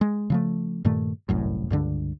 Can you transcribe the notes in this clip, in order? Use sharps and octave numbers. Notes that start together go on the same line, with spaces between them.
G#3
C#3 F3 A3
G2 A#2 D#3 A3
G1 C2 F#2 A2
C#2 G2 D3 D4